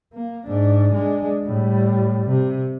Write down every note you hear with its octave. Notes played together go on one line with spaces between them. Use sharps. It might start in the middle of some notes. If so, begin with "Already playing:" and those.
A#3
G#2 D4
G#3 D4
A2 G3
C3